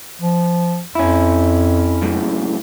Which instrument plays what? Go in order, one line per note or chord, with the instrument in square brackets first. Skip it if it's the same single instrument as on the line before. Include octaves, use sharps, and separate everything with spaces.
[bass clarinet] F3
[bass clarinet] F2 [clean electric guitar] C#4 E4
[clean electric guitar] F#2 A2 C#3